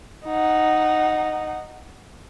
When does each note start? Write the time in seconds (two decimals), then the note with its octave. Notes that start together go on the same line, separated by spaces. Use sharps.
0.26 D#4 F#5